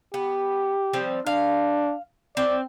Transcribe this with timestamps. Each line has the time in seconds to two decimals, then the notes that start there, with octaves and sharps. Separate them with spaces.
0.14 B3 G4
0.93 F3 G3 C4
1.26 D4 F5
2.37 C4 D5